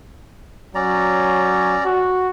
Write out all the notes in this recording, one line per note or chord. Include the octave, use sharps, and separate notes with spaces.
F#3 C#4 D5 A#5
F#4